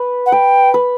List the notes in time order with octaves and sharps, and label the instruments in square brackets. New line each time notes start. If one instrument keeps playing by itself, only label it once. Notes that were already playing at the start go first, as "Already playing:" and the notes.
Already playing: [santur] B4
[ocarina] F#5
[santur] B4 [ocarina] G5
[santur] B4